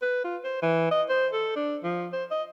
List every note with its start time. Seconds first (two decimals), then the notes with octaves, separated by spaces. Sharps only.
0.02 B4
0.24 F4
0.44 C5
0.62 E3
0.91 D#5
1.09 C5
1.33 A4
1.56 D4
1.84 F3
2.13 C5
2.31 D#5